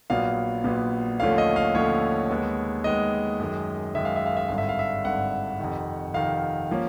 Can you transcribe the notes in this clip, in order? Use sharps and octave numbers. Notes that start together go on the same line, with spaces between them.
A#1 A#2 F#3 B3 F5
A#1 A#2 F#3 B3
D#2 D3 F3 A3 C#4 F5
D#5
F5
D#2 D3 F3 A3 C#4 C#5
D#2 D#3 G#3 B3
D#2 D#3 G#3 B3 D#5
F#2 D#3 G#3
F#2 D#3 G#3 E5
F5
E5
F5
E5
G#1 G2 D3 F5
E5
F5
E5
G#1 G2 D3 F#5
F2 C3 D#3
F2 C3 D#3 F5
F3 A#3 C#4